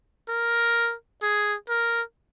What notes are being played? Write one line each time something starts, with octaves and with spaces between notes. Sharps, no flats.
A#4
G#4
A#4